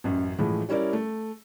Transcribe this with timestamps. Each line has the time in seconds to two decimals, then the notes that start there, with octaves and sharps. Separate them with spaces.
0.04 A1 F#2
0.38 A2 E3 F3 G#3
0.69 G3 C#4 E4 A#4 D5
0.93 A3